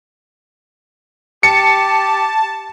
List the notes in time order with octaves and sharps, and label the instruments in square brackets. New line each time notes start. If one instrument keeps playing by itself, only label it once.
[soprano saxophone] G4 [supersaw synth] A5 [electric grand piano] C#7